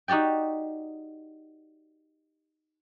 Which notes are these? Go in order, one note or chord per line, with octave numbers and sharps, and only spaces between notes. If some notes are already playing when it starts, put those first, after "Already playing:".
D#4 F#4 G4 D5 G5